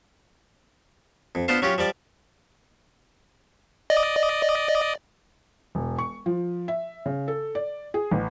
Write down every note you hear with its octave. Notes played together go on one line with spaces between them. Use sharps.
F2
B3 D4 F4 C5 F5
F#3 C#4 F4 G4
F3 G3 D5
D5 D#5
E1
C#6
F3
E5
C#3
A4
D5
G#4
A1